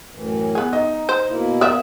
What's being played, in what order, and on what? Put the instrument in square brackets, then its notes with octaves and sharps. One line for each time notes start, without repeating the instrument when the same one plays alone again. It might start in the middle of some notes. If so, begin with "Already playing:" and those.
[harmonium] F#2 A2 E3
[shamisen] B3 G#4
[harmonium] D#4 [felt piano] D#5
[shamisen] C5
[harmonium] B2 A#3 E4
[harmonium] A#3 B3 [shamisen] A#4 D5 E5 [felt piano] D#6